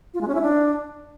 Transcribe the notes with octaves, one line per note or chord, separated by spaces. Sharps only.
F4
G#3
C#4
E4
D4